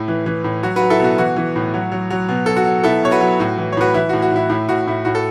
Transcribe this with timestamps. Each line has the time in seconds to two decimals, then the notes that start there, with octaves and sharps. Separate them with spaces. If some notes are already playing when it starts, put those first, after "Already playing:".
Already playing: A2 E4
0.08 E3
0.26 E3
0.44 A2
0.63 F#3 F#4
0.76 F#4 B4
0.81 F#3
0.90 E4 A4
1.00 B2 F#4
1.18 E3 F#4
1.36 E3
1.56 A2
1.74 F#3
1.92 F#3
2.10 F#3
2.29 B2
2.46 F#3 A4
2.56 F#4
2.65 F#3
2.84 B2 E4 A4
3.03 B2 C#5
3.11 F#4 B4
3.20 F#3
3.40 A2 F#4
3.58 E3
3.72 C#5
3.77 A2 F#4 B4
3.94 E3 E4
4.09 A2 F#4
4.22 F#4
4.31 A2 E4
4.50 A2 E4
4.69 A2 F#4
4.87 A2 E4
5.05 A2 F#4
5.15 A4